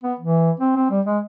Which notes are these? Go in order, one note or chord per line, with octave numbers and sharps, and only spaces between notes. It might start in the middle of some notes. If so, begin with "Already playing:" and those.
B3
E3
C4
C4
G3
G#3